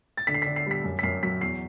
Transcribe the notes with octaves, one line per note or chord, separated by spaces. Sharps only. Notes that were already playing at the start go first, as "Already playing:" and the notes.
A6
D3 B6
C7
D3 B6
C7
G3 B6
F#2
B6
F#2 C7
F#3 B6
E2 C7